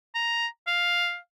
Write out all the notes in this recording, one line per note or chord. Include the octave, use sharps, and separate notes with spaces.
A#5
F5